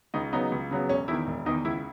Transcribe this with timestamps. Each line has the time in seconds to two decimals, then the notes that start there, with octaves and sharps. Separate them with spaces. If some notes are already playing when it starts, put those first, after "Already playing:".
0.14 C#2 D#4
0.33 C#3 F#3 B3 D#4
0.52 C#2
0.71 C#3 F#3 B3
0.89 E1 C#4
1.08 E2 D#3 E4
1.27 E1
1.46 E2 D#3 D#4
1.65 C#2 E4